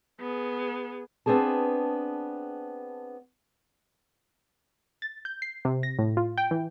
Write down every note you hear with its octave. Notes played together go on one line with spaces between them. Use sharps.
B3 G#4
B3 C4 D4 G#4 A5
A6
G6
C7
C3
A#6
A2
F4
G5
E3